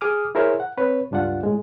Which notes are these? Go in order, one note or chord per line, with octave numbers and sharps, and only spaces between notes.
G#4 D6 D#6 F6
E4 G#4 A#4 C5 C#5 E5
F#5
C4 B4 C#5
C#2 G2 D4 F4 F#5
A2 G#3